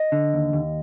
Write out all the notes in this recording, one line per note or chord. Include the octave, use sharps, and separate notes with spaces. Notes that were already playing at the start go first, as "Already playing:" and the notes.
Already playing: D#5
D3
D#2
D#2